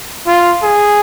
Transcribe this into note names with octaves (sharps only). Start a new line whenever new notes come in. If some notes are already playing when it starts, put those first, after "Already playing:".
F4
G#4